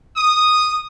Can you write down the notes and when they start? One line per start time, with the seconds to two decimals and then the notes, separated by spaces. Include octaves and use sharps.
0.16 D#6